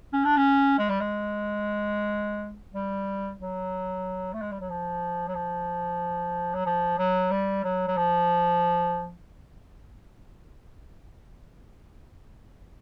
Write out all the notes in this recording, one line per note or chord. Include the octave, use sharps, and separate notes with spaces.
C#4
D4
C#4
G#3
G3
G#3
G3
F#3
A3
G#3
G3
F#3
F3
F#3
F3
F#3
F3
F#3
G3
F#3
F#3
F3